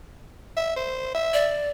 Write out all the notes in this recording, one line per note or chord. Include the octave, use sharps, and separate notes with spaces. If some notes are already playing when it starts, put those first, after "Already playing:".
E5
C5
E5
D5